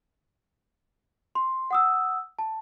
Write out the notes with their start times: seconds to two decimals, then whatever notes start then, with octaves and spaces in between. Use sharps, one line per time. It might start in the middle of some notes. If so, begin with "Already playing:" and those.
1.35 C6
1.71 F#5 D#6 E6
2.39 A5